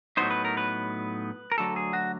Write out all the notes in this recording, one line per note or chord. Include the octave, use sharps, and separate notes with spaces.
A2 F#3 B3 D#4 C5
B4
A#4
B4
A#4
D2 D3 F#3 A4
G#4
F#4